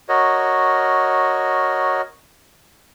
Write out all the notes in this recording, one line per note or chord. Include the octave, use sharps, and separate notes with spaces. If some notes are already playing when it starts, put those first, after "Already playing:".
F#4 A#4 C#5 D#5